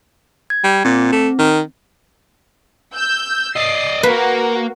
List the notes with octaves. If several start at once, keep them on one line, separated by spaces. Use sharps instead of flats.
G#6
G3
A#2 C4
A3
D#3
E6 G6
D5 D#5 C7
A#3 F#4 A#4 B4